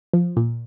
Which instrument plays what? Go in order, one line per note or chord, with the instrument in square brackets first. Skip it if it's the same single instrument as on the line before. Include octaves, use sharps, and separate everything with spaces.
[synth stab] F3
A#2